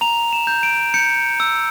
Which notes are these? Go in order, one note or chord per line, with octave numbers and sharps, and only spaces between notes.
A#5 F7
E7
G6
D7
G6 C#7
E6